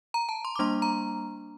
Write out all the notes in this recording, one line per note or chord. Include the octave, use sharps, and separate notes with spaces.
A#5
A5
C6
D6
G3 A#3 D4 C6
A#5